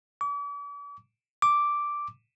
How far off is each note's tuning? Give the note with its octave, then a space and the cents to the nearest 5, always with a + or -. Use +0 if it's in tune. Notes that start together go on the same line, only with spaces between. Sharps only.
D6 -40
D6 +0